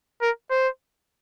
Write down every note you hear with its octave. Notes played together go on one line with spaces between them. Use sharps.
A#4
C5